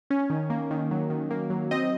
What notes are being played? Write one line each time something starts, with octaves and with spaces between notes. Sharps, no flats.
C#4
D#3
A#3
D#3
F#3
D#3
A#3
F#3
C4 D#5